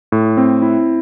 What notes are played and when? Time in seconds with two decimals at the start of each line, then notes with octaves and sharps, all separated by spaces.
0.12 A2
0.37 C4
0.62 E4